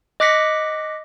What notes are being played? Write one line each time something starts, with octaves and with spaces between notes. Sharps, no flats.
D#5 D6 F#6 A#6 B6 C#7